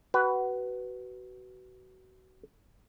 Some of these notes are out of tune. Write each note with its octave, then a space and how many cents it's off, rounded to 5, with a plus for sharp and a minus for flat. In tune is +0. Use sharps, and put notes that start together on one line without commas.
F#4 +25 B4 +0